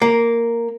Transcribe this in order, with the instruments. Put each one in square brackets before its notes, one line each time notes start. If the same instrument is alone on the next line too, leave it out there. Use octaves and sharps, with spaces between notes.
[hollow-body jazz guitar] A#3